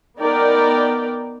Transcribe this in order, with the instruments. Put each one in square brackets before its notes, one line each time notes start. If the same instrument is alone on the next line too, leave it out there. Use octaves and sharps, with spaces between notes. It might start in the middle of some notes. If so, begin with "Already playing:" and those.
[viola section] B3 D#4 A#4 D5 G5